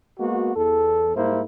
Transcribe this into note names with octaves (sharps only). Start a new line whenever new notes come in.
G#3 A#3 B3 F#4
E2 A4
G#2 G3 A#3 E4 C5